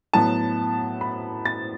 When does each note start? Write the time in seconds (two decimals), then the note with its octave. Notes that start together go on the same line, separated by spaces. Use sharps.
0.13 A2 F#3 B3 A5
1.01 B5
1.45 A6